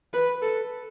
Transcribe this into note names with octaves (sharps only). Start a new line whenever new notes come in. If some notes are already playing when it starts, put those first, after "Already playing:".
B4
A4